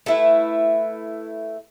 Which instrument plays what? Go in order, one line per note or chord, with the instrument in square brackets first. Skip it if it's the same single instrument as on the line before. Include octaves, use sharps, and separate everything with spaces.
[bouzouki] A3 E4 B4